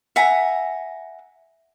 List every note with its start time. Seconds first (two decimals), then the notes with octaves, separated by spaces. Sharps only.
0.16 E5 F#5 G#5 A#5